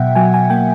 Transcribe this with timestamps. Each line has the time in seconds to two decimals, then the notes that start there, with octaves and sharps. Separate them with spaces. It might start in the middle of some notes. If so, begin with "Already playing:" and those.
Already playing: B2 F#3 E5 F#5 G5
0.15 F#3 G#5
0.34 G#5
0.50 A#3 G5